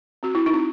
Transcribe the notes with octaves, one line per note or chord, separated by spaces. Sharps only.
C4 F#4
E4
D#4
C4